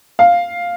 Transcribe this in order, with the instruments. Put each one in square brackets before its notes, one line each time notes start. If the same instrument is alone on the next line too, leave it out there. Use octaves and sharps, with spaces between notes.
[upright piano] F5